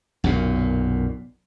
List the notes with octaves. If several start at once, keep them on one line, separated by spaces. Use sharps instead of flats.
B1 F#2 A#2